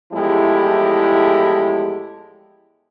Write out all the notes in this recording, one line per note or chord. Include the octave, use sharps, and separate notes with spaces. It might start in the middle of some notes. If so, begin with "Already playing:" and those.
E2 A2 F3 G#3 E4 G4